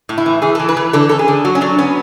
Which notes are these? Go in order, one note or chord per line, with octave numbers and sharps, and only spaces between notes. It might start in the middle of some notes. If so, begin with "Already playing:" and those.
A2
E4
E3
E3 G#4
E3 A4
B4
E3
D3 A4
C#4 A4
G#4
D3
F#3 F#4
C#4
F#3 D4
B3 C#4